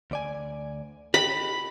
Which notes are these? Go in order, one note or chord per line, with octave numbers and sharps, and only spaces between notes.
D2 D5 G#5
G4 D#5 G5 B5